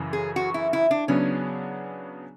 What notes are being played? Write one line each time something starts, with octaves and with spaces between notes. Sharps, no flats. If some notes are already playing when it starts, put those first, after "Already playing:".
Already playing: F#2 C#3 E3
G#4
F#4
E4
E4
D4
C#3 F#3 B3 C#4 D4 G#4